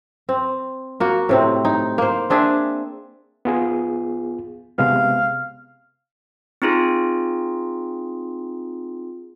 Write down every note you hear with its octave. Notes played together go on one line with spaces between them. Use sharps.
C4
A#3 F#4
A2 C3 C4
D#4
A#3 C5
C4 D4 G#4 E5
B3 F4 G#4
C3 G#3 B3 F5
C4 D#4 F4 G#4